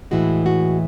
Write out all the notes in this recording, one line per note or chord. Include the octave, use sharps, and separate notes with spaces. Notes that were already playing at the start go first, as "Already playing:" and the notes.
A2 E3 G#3 F#4
F#4